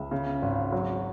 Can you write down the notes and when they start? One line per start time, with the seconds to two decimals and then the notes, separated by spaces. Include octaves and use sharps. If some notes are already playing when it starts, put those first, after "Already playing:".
Already playing: C#2 E5
0.11 C#3
0.42 G#1
0.72 F#3